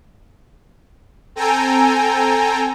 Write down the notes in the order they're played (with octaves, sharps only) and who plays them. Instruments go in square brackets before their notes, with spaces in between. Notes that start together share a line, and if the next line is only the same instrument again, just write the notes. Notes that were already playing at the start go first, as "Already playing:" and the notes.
[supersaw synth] C4 A4 G5 G#5 A#5